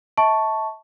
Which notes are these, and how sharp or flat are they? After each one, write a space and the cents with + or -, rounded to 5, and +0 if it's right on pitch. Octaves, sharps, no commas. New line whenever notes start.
E5 -40 A5 +0 C#6 +0